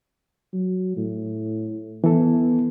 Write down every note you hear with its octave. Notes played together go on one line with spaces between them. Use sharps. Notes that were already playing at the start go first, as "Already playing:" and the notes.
F#3
A2
E3 B3 A4